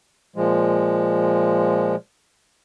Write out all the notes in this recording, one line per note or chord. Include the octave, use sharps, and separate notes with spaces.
A#2 F3 G#3